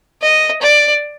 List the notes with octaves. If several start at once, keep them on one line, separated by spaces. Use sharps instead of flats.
D#5
D5